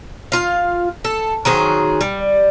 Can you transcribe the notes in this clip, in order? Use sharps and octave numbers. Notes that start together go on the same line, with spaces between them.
F4 F5
A4
D#3 F#3 G#4 C5
G3